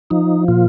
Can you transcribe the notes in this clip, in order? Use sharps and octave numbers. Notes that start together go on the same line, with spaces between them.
F3 D#4
A#2 F4